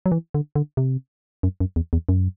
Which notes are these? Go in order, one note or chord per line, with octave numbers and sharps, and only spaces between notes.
F#3
E3
D3
D3
C3
F#2
F#2
E2
E2
F#2